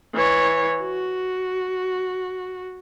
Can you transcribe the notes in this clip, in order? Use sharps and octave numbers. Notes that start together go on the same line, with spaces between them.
E3 C#5
F#4